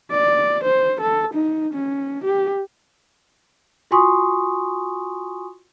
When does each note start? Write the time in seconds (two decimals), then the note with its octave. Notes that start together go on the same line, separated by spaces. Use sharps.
0.11 D5
0.64 C5
1.01 A4
1.35 D#4
1.74 C#4
2.25 G4
3.91 F4 F#4 G#5 C6 C#6 D#6